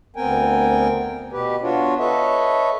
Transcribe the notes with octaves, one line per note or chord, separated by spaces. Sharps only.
D2 B3 C4 A#4 G5 G#5
B2 G4 B4
B3 D4 F4 F#4 C#5
A4 B4 C#5 D#5 E5